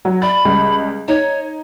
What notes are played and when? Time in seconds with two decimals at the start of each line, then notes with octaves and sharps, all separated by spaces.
0.05 F#3
0.22 D5 B5 A6
0.45 C#2 G3
1.08 D#4 C#5